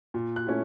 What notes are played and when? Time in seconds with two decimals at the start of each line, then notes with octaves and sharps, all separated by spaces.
0.14 A#2
0.36 F#6
0.47 A3 C#4 E4